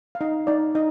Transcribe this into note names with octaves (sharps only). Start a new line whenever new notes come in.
F5
D#4 D#5
D#4 D5
D#4 D#5